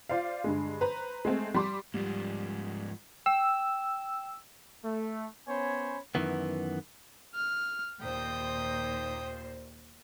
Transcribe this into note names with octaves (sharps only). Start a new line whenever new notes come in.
F4 C5 D5 F5
G2 D3 G#3
B4 C5 A#5
G#3 A3 C4
G3 C6 D6
G#2 F3 G3
G5 E6
A3
B3 C#4 C5 C#5 G#5 B5
F#2 D#3 E3 B3
F6
D#2 A#2 C5 G5 D#6